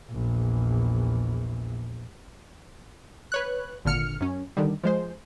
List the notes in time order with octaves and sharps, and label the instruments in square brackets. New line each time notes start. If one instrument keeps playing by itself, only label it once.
[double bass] A#1 E2
[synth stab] B4 C#5 F#6
G#1 A#2 D3 F6 C#7
F#2 C#4
D3 D#3 G3
F3 G#3 C5